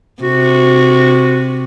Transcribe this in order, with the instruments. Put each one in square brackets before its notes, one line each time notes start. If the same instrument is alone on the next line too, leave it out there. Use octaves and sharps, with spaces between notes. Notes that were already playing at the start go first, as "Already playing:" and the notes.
[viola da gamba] C3 [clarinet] F#4